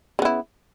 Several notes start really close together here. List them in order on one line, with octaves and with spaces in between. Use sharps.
C#3 B3 E4